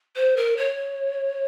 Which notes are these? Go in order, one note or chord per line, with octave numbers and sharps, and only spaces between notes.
C5
A#4
C#5